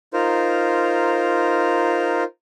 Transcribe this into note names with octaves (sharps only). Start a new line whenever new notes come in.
D#4 F4 A#4 C5